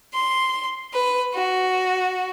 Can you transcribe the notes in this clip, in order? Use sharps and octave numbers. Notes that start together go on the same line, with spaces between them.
C6
B4
F#4